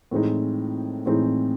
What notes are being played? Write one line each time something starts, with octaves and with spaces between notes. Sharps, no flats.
A2 E3 G#3 C4 D#4
A2 E3 G#3 C4 D#4